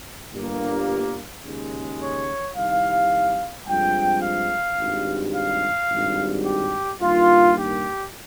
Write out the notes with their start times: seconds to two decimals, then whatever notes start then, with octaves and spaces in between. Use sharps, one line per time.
0.33 G1 G2 G3 A#3
1.45 D#2 C#3 G#3
2.00 C#5
2.56 C2 C3 D#3 F5
3.67 G2 F3 G#3 C4 G5
4.22 F5
4.79 G#1 G2 G3
5.34 F5
5.90 G#1 G2 G3
6.46 G4
7.01 G2 D#3 A#3 F4
7.57 G4